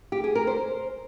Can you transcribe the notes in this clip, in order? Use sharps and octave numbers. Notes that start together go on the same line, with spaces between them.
G4
G#4
A#4
C5